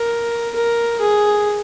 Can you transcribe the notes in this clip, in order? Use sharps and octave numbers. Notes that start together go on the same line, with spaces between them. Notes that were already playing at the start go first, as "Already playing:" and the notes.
Already playing: A#4
A#4
G#4